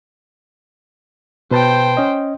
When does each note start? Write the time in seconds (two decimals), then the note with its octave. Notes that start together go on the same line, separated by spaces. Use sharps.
1.51 B2 B4 C5 G5 A5
1.97 C#4 D#5